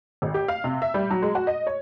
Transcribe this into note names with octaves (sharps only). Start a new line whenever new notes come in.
G#1
G4
F5
C3
E5
G3
F#3
G#3
F#4
D#5
C#5